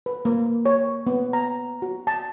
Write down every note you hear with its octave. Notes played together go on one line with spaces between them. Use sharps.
B4
A#3
C#5
B3
A#5
F#4
A5